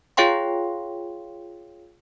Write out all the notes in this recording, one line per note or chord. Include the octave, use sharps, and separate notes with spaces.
F4 G#4 C#5 F5 G5 C6